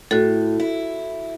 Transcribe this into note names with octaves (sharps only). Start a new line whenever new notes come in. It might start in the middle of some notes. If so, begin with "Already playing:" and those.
A2 F#4 A4
E4